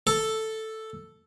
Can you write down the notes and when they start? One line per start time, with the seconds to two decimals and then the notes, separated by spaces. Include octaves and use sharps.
0.07 A4